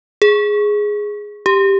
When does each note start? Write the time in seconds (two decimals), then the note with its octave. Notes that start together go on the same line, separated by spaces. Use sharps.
0.22 G#4
1.46 G4